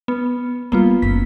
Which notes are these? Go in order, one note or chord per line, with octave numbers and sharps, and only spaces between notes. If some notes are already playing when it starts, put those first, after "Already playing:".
B3
G3 A#3 B3 F4
F#1 D3 B6